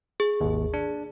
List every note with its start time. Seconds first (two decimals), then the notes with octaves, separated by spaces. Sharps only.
0.20 G#4
0.41 G#1 D#2
0.74 D4